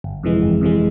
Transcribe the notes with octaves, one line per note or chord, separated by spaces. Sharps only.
G1
F2 C3 E3 G#3
G1
F2 C3 E3 G#3